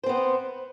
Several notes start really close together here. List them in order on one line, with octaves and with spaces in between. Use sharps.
C5 C4 B3